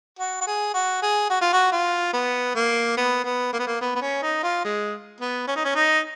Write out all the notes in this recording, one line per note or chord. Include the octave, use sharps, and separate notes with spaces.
F#4
F#4
G#4
F#4
G#4
F#4
F4
F#4
F4
B3
A#3
B3
B3
A#3
B3
A#3
B3
B3
C#4
D#4
F4
G#3
B3
C#4
D#4
C#4
D#4